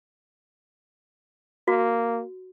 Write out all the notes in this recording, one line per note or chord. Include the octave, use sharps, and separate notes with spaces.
A#3 F#4